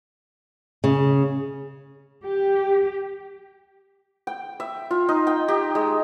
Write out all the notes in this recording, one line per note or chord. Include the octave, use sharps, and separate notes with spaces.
C#3
G4
G5
E5
F4
D#4
G5
G4
G#3